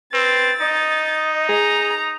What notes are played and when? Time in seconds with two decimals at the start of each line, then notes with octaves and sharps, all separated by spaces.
0.14 C4 B4 A6
0.61 D#4 D#5
1.49 G#4 A#5